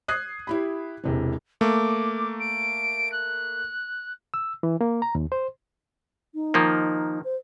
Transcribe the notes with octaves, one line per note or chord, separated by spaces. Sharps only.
D#6 F#6 G#6 C7
E4 G4 B5
E1 C3 E3
A3 A#3 D6
D7
F#6
E6
E3
A#3
A#5
D#2
C5
D#4
D#3 F3 A#3
C5